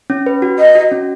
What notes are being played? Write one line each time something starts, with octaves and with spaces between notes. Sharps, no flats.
C#4
B4
F#4
F#4 D#5
F#4
C#4